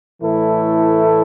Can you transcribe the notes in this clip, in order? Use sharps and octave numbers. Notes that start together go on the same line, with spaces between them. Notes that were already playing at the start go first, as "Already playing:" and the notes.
A2 E3 A3 E4 A4